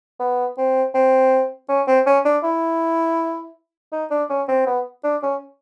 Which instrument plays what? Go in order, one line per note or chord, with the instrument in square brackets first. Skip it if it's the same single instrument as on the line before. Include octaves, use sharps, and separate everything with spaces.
[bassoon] B3
C4
C4
C#4
C4
C#4
D4
E4
D#4
D4
C#4
C4
B3
D4
C#4